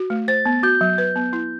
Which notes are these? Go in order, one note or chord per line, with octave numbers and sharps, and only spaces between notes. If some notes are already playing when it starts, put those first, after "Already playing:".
Already playing: F#4
A3
C5 A6
B3
F#4 G6
F#3
B4
B3
E4